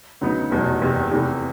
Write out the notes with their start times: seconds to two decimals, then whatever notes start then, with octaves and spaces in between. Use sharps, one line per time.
0.21 D2 C#3 F#3 B3 D#4
0.51 F1 E2 B2 F#3
0.81 F#1 E2 C3
1.11 E2 C3 E3 A3